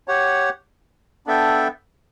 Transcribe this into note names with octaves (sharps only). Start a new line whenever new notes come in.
G4 C#5 F#5
B3 D4 A4 E5 G5